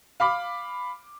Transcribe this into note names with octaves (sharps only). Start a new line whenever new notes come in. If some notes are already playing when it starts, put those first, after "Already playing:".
F5 B5 D6